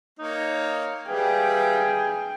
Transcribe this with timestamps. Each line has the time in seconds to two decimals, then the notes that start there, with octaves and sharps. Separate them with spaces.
0.19 A#3 D#4 C#5
1.08 G3 G#4 B4 D5 E5 F5 G5